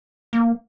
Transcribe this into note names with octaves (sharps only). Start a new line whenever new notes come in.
A#3